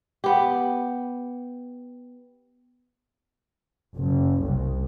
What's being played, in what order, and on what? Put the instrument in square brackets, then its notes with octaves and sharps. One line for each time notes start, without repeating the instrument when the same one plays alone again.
[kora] B3 G4
[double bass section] F#1
C2